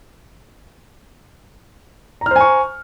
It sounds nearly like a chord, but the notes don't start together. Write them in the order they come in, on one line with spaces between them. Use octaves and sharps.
A#5 F6 C5 G#5 C#6